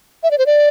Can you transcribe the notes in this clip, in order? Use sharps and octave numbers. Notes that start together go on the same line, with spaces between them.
E5
D5
C5
D5